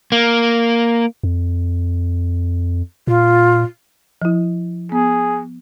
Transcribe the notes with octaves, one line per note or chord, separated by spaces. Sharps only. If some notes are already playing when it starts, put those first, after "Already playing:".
A#3
F2
A#2 F4
F3 E4
B3 G#4